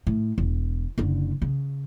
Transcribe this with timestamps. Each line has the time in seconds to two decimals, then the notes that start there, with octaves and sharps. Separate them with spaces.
0.07 A2
0.38 E1
0.98 F#1 D3
1.42 C#3